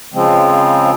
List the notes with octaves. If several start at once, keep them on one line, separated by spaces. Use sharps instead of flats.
C#3 F3 G#3 C4